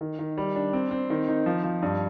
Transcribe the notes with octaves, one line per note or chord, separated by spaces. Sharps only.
D#3
D#3
G3
D4
C4
C4
D#3
D#4
F3
F3
G2